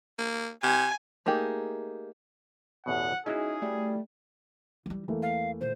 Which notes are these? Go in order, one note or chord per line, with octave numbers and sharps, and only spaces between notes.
A#3
C3 G#5
A3 A#3 D#4 G4 G#4
A1 E2 B2 F#5
G#3 C#4 D#4 E4 F#4 G#4
G3 A3
E3 G3
E2 E3 A3 A#3
F5
A#2 D3 C5